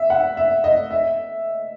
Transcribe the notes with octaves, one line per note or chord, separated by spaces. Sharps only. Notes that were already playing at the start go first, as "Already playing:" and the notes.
Already playing: E5
F#5
E5
D#5
E5